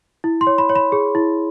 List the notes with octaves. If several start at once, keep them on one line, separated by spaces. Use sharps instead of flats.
E4
C6
C#5
B5
C#5
B5
G#4
E4